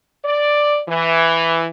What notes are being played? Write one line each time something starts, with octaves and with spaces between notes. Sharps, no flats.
D5
E3